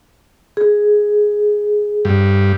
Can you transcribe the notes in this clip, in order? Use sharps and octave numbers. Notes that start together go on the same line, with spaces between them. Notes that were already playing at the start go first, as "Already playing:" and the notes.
G#4
G2